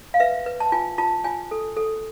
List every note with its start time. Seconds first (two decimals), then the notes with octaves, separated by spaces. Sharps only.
0.14 F5
0.20 B4 E5
0.46 B4
0.60 A5
0.72 F4 G#5
0.98 F4 A5
1.24 F4 G#5
1.51 A4
1.77 A4